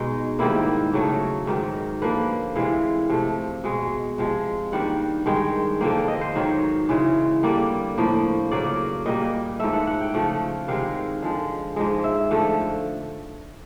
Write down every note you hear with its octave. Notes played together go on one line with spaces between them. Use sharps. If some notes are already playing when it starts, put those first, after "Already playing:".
Already playing: B2 G#3 D#4
G#2 D#3 G3 A#3 E4
C#3 F#3 A3
G#2 D#3 F#3
D3 F3 A#3 B4
C3 E3 G#3 F5
C3 F3 A3
B2 G#3
C3 F3 G#3
G2 D#3 G3 A#3 F#5
G2 D#3 G#3 G5
D3 F3 A#3 G5
D#5
C5
G#2 D#3 F#3
C#3 E3 G#3
D3 G3 A#3 D5
A2 F3 A#3
C#3 F#3 A#3 D5
A#2 G3 A#3 D#5
G#2 F3 A3 E5
F#5
F#5
G5
C#3 F3 A3 F#5
C3 D#3 G#3 F5
D3 F3 G#3
G#2 F3 G#3 D#5
E5
D3 F3 A3